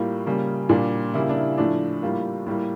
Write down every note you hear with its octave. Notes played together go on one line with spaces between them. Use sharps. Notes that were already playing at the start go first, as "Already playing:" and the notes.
Already playing: A2 G3 A#3 F4
C#3 G3 A#3
A#2 G3 A#3 D4
C#3 G3 A#3 E4
D4
E4
A2 F3 A3 D4
A2 G3 A#3 F4
A2 G3 A#3